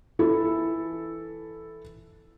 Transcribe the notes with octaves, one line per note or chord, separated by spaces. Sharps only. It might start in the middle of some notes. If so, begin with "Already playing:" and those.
E3 E4 A4